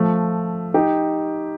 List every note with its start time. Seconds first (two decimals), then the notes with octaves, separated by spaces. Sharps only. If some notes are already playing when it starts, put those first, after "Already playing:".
Already playing: F3 A3
0.74 D#4 G4